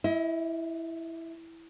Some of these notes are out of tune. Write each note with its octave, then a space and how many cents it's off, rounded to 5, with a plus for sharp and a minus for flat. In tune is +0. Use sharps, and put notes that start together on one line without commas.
E4 +0 D#5 +35